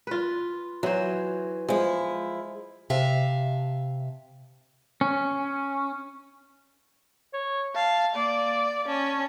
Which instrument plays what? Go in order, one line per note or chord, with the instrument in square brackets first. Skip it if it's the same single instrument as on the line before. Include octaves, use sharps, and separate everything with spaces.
[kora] F4 B4
[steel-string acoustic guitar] E3 [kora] F#3 C5
[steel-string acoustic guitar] F3 E4 [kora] G#3
[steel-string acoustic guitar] C3 E5 F5 A5
[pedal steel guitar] C#4
[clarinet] C#5
[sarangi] F5 [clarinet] A5
[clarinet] A#3 [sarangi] D5
[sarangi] C#4 [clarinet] A5